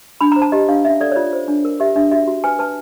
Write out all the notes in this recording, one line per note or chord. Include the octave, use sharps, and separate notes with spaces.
D4 B5
C5 A#5
A5
G4 D#5
D4 F5
C#4 E5
A4 D5
C#5
F4 D5
C5
D4
A#4
G4 E5
D4 E5
F#4 E5
F#4
B4 G#5
B4 A5